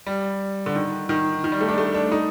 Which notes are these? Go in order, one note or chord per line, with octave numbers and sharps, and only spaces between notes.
G3
D3
D#3
D#3
D#3
G3
A3
D4
A3
D4
D#4